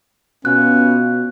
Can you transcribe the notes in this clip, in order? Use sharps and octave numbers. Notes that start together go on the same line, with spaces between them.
B2 B3 C#4 F4 F#6